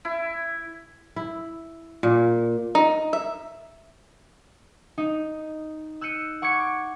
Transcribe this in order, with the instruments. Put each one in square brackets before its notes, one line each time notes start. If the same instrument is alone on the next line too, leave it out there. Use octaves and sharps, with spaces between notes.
[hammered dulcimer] E4
[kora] E4
A#2
[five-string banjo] D#4
E5
[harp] D#4
E6 F#6 G6 C#7 D#7
F#5 C#6 D6 G#6 C#7